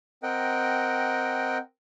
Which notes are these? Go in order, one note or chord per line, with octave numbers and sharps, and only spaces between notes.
C4 A#4 D#5 F#5 G5